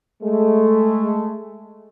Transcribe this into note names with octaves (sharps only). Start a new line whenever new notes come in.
G#3 A3